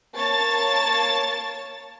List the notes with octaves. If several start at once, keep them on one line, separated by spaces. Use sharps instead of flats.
A#3 C#5 A5 A6